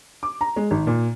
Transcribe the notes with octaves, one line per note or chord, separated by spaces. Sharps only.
D6
A#5
G#3
G#1
A#2